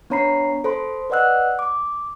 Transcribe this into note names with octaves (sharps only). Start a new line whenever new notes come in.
B3 D4 C#5 A#5 B5 C7
A4 C5 B5 C6
B4 D5 D#5 F#5 E6 F#6
D6